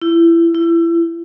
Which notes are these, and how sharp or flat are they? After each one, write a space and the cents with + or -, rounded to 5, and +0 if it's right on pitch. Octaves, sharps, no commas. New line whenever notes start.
E4 +25
E4 +30